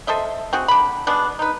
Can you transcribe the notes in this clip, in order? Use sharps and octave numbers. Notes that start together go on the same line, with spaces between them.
A4 C5 D#5 E5
C4 F#4 G#4
D3 B5
B2 G#3 B3 D4
D#4 B4